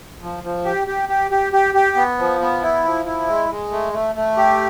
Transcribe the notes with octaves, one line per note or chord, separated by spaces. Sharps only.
F3
F3
G4
G4
G4
G4
G4
G4
B3
F3
B3
E4
F3
E4
G#3
G#3
A3
A3
A3
G4